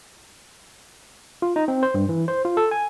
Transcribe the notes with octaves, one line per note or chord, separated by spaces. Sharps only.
F4
D#4
C4
C5
G2
E3
C5
F4
A4
G#5